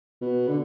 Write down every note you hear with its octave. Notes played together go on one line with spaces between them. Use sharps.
B2
D3